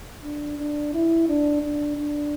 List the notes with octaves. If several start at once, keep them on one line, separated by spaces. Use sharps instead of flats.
D4
D4
E4
D4
D4
D4